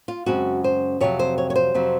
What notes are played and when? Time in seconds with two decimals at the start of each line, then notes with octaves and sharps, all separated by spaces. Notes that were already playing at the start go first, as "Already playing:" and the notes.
0.08 F4
0.26 F#2 C#3 G#3 C4 F#4
0.64 C5
1.01 F2 C3 F#3 C#5
1.19 C5
1.38 C#5
1.50 C#5
1.56 C5
1.74 F2 C3 F#3